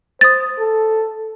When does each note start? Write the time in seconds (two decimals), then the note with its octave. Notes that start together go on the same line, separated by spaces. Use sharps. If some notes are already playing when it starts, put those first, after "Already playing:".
0.21 C5 D#6 A6
0.59 A4